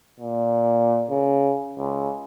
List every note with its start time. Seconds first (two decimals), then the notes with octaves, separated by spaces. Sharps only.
0.20 A#2
1.10 C#3
1.79 C#2